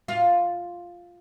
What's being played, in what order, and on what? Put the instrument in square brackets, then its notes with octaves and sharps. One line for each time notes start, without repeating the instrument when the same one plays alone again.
[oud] F4